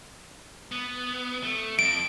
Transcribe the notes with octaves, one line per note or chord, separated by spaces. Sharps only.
B3
A3
F2 D7